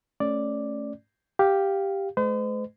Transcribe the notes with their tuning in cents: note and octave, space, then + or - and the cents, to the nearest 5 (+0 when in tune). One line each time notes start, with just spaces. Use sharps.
A3 +0 C#4 +0 D5 +0
G4 +0 F5 +0
A3 -45 C5 -45 D#5 -30